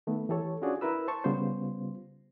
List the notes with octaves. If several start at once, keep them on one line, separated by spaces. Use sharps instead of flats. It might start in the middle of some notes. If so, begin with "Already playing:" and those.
D#3 A3 B3
E3 G4 A4 C#5
C#4 D4 F4 F#4 G#4 D5
E4 A#4 B4 E6
C5 A5 C#6
C#3 G3 B3 F4 C5